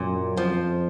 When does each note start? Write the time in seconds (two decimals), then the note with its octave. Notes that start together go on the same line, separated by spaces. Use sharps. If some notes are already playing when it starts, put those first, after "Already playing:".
Already playing: F#2 A#2
0.37 F2 F3